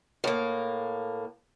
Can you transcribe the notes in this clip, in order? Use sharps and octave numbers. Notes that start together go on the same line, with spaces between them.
A2 A#3